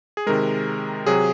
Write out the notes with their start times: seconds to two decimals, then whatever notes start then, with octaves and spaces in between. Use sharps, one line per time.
0.17 G#4
0.27 C3 D#3 G#3 A#4
1.07 C3 F#3 G#4